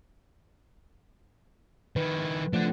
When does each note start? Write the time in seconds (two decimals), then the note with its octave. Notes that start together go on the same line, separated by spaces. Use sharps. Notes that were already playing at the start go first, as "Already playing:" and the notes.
1.96 D#3 E4 B4
2.53 F3 A3 D4 F#5